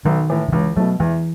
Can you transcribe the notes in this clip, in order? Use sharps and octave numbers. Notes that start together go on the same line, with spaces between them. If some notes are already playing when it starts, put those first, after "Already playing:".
B1 D#3
A2 E3
D#3
C#2 E3
B2 F#3 A3
E2 E3